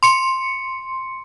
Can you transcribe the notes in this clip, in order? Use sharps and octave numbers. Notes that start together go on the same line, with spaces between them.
C6 C#7